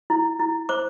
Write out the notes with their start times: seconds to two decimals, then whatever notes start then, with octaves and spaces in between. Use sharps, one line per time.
0.10 E4
0.39 E4
0.69 C5 D6